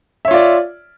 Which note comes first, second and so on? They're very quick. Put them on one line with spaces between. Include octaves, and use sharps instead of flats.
E5 C#5 F4 D5